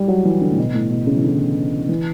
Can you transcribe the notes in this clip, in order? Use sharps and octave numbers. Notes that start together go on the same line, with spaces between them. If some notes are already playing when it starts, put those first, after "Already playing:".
Already playing: G3
F#3
E3
D3
A2
B2
A2
B2
C#3
E3
D3
E3